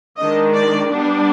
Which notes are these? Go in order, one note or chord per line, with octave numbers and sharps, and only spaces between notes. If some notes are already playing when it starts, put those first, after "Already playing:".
D#3 G#3 D4 D#5
D5
G3 B3 D4